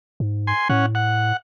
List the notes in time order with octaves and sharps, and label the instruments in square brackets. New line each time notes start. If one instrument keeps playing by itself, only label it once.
[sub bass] G#2
[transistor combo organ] G#5 C6
[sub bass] A2 [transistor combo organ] C#4 F#5
[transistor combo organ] F#5